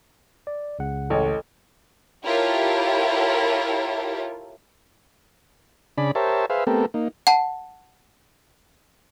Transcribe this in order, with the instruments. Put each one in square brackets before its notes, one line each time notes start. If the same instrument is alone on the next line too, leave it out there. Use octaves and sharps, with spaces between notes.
[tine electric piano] D5
C#2 C#3 F#5
[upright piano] A1 C#5 [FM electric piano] A4 D#5
[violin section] E4 F4 G4 A4 A#4 C#5
[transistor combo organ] C#3 D4 G#4 D5 B5
G4 A#4 C5 C#5 E5 A5
G#4 B4 C5 E5 F5
A3 B3 C4 G4 A4 A#4
A#3 D#4
[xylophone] F#5 A5